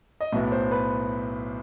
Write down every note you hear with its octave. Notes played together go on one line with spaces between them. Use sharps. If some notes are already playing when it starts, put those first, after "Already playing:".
D#5
B1 A2 F#3 B3 E5
C5
B4